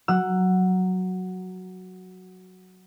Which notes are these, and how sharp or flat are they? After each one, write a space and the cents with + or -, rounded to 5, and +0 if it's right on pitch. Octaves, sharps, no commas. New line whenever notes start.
F#3 +0 F#5 +0 E6 +20